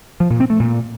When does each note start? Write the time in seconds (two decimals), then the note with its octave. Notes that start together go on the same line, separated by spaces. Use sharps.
0.20 F3
0.30 A#2
0.40 C4
0.50 A3
0.60 A#2